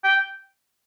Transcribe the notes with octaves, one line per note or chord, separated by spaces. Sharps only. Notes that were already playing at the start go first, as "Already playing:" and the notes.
G5